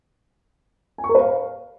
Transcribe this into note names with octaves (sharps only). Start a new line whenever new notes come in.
G#5
C#6
A#4
B4
F5